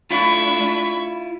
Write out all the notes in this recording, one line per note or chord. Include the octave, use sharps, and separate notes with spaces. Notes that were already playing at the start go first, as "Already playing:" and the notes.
A3 D4 E4 F4 B5 C#6